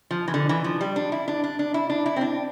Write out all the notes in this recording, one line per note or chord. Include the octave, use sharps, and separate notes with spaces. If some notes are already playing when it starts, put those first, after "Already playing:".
F3
E3
D3
E3
F3
G3
D4
E4
D4
D4
D4
E4
D4
E4
C4
D4